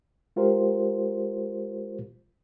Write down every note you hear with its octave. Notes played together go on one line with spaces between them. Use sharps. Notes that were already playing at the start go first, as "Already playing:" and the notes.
G#3 F4 G4 A#4 C5